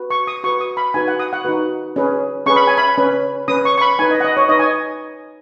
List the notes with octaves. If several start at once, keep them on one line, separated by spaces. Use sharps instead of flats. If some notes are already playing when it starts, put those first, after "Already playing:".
Already playing: F#4 B4
C#6
D#6
F#4 B4 C#6
D#6
B5
D#4 F#4 B4 G#5
F#5
D#6
F#5
D#4 F#4 B4
C#4 G#4 B4
C#4 G#4 B4 C#6
B5
G#5
B5
C#4 B4
C#4 B4 D#6
C#6
C#6
B5
D#4 B4 G#5
D#5
F#5
D#5
C#5
D#4 B4 D#5
G#5